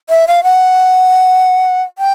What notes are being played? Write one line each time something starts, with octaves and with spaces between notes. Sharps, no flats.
E5
F5
F#5
G5